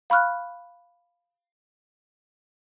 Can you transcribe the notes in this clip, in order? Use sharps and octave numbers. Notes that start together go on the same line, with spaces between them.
F5 B5 C#6 F6 F#6